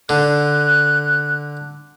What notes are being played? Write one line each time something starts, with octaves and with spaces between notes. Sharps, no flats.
D3 F#6